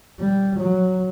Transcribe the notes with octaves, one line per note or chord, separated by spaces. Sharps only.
G3
F#3